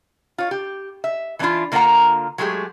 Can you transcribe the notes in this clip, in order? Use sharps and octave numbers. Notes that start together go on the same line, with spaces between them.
F4 C#5
G4
E5
E3 A3 C4 D4 E4 F4
D3 A#3 F4 A#4 F#5 A#5
F#3 G#3 A3 G4 G#4